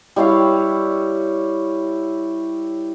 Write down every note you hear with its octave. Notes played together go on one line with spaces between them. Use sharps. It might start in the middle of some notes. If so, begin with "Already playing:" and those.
G3 E4 C#5 F5